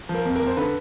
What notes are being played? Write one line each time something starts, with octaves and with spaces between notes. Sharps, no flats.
F3
A#4
F2
A#4
F2
C5
D3 B4